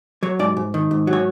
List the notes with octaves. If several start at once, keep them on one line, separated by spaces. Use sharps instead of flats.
F#3 C#5
G#2 D5
G#2
D#3
G#2
F#3
C#5